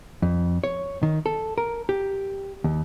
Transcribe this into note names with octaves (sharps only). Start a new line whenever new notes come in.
F2
C#5
D#3
A4
A#4
G4
D#2